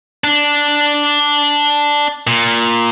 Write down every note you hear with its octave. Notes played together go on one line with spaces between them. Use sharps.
D4
A#2